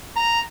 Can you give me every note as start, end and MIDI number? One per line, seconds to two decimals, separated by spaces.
0.16 0.40 82